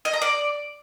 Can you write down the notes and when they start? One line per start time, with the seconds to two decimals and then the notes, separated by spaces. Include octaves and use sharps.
0.05 D#5
0.13 A#5
0.22 D5